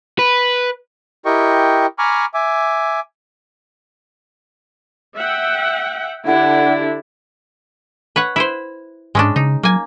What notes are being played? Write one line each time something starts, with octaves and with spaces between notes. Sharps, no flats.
B4
E4 G4 A#4 D#5 G5 C#6
G#5 A#5 B5 C#6 D6 F6
E5 G#5 D6
E5 F#5 G5
D3 D4 E4 G4 F#5
B4 C#5 F#5
E4 B4 C5
G#2 G#3 C#4 D4
C#3 D#4
F#3 A#3 G#5